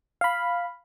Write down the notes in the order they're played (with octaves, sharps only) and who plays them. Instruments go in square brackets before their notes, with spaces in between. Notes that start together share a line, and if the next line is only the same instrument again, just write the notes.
[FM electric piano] F5 B5